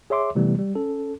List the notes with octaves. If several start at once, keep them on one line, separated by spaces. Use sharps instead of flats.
G#4 C#5 E5 C6 D6
C3 E3 G3 A3 B3
G3
C#4 A4